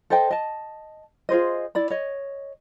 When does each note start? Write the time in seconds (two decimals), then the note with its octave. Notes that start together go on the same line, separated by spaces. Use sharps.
0.10 A4 C5 D#5 G5
0.30 D#5 A5
1.29 F4 G#4 C5 D#5
1.75 E4 D5 B5
1.90 C#5 D#5